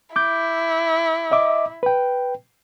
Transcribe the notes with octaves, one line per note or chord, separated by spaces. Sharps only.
E4 D6 G6
D#5 E5 D6
B4 G5